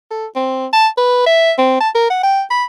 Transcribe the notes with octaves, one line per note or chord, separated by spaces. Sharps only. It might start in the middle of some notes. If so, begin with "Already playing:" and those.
A4
C4
A5
B4
E5
C4
A5
A#4
F#5
G5
B5